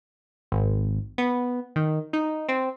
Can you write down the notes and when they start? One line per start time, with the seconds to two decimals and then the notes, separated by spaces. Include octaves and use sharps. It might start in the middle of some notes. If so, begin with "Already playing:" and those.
0.52 G#1
1.18 B3
1.76 D#3
2.13 D#4
2.49 C4